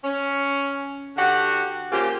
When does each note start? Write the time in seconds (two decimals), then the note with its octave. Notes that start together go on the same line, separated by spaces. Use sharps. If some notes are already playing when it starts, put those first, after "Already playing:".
0.04 C#4
1.17 D3 F#4 G4 F#5
1.92 C#3 F3 A#3 F4 G4